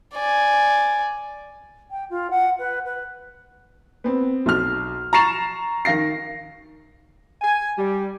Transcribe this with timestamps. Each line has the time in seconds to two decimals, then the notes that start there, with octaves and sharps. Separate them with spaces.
0.15 D5 G#5
1.91 G5
2.10 F4
2.30 F#5
2.59 B4
2.85 B4
4.04 B3 C4
4.46 B1 F6
5.13 A#5 C#6 A6 C7 E7 F7
5.85 D#3 F5 A#6 C7
7.42 G#5
7.78 G3